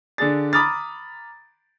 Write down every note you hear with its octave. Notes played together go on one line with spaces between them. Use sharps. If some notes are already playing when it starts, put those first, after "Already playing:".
D3 D4 G#4 A6
A#5 B5 D6 D#6 F6 A6